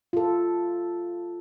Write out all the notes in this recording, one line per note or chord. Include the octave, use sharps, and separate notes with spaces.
F4 A4